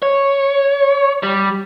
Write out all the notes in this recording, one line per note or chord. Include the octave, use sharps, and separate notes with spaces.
C#5
G3